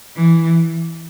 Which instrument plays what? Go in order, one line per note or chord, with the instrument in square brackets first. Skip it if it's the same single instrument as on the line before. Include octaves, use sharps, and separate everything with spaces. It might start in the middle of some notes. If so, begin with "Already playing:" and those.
[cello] E3